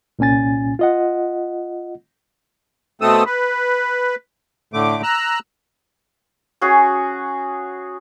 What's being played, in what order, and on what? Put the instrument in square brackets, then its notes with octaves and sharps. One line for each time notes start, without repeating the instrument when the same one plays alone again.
[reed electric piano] C2 A#2 C#4 G#5 A6
F4 D#5 F#5
[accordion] B2 A3 C4 A4 D#6 E6
B4
A2 D3 A3 D6
A#5 E6 F#6
[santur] C#4 F#4 G#4